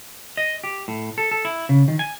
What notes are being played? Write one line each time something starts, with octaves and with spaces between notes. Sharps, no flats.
D#5
G4
A2
A4
A4
E4
C#3
D#3
G#5